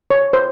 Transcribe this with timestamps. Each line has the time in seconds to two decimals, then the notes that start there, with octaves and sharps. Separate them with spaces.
0.10 C#5
0.33 C5